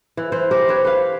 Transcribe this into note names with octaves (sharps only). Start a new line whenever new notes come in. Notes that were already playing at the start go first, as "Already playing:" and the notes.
E3
E3 C5
G4 A#4 C5
C4 B4 C#5
B4 F5